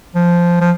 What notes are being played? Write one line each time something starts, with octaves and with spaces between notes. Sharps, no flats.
F3
F3